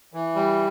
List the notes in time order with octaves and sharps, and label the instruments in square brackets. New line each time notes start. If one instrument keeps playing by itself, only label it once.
[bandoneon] E3
G3